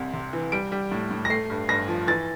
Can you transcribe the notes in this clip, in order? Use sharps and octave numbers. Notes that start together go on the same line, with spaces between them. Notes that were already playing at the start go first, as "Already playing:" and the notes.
Already playing: C2 C3
C3
E3
G3 D7
G3
A2
A2
A#6
A3 C7
G2
G2 A#6
F3
E3 A6